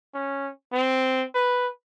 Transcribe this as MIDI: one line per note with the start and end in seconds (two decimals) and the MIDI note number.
0.14 0.49 61
0.73 1.24 60
1.35 1.68 71